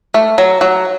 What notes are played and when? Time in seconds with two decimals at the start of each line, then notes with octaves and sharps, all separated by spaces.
0.14 A3
0.38 F#3
0.61 F#3